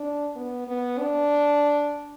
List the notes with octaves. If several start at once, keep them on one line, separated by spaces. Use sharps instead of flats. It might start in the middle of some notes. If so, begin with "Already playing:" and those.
Already playing: D4
B3
B3
D4